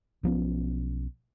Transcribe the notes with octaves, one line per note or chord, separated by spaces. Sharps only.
B1 F3 B3 C#4